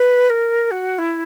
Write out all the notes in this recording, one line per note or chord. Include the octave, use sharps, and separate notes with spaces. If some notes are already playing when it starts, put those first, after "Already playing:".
Already playing: B4
A#4
F#4
E4